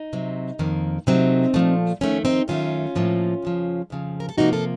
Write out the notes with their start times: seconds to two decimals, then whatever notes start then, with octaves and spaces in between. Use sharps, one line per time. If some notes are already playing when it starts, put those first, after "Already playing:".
Already playing: D#4
0.13 C3 F#3 C4
0.59 F2 D#3 A#3
1.07 C3 F#3 A3 C4 D#4
1.54 A#2 F3 A3
2.01 F2 D#3 A3 C#4
2.25 C4 D#4
2.48 F#2 D#3 A3 C#4 F4
2.95 A2 F3 A#3
3.42 F2 C#3 F3
3.90 F2 C#3 F3
4.20 A#4
4.29 A4
4.38 C3 F3 A#3 D#4 F#4
4.53 F4 A4